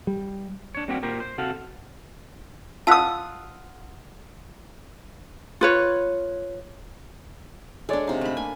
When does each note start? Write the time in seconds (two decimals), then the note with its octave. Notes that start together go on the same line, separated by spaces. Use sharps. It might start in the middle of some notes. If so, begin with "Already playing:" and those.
0.07 G3
0.75 D4 C#5
0.88 G3 A#3 C4 D4 F#4 G4
1.02 A#2 G4 A#4 C5
1.20 C5
1.38 C3 F#4 A4 F5
2.87 F4 F#5 A5 D#6 E6 B6
5.61 F4 B4 C#5
7.89 G#3 D4 A4 C#5 D5
8.07 C3 D#4 F5
8.21 A3 B5
8.37 A#3 G#5